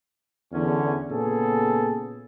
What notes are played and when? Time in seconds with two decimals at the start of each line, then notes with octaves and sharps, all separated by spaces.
0.53 E2 D3 C#4
1.10 A#2 C#3 B3 G#4 A4